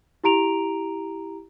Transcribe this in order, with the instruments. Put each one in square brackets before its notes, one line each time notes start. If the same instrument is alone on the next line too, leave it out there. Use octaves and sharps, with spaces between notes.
[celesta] E4 G4 A#5 D7 F7